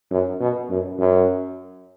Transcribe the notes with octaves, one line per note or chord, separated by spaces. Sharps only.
F#2
B2
F#2
F#2